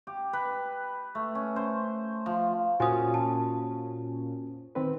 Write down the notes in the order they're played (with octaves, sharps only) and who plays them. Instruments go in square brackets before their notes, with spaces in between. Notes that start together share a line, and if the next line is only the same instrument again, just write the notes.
[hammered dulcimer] G4
B4
A3
C#4
C5
F3
[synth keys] A#2 C#4 [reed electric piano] F4 F#4 C5 [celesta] G#5 D#6
[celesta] A5
[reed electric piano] D#3 C4 B4